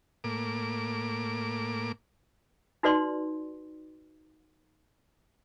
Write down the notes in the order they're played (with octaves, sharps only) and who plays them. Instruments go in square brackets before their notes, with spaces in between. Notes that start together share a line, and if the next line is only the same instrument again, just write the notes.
[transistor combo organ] A2 A#3 D6
[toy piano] D#4 F#4 B4 D5 C6